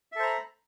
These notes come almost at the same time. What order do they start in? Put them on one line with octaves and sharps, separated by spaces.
E5 A4 C5 A#5 B5